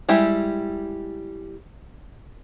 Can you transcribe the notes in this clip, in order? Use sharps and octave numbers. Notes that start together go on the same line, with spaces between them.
G3 G#3 E4 G4